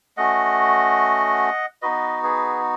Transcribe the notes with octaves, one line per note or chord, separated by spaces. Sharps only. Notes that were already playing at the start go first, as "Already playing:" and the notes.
A3 C#4 F#4 D#5 F#5
B3 D#4 F#4 B4 D#5
G#4 B4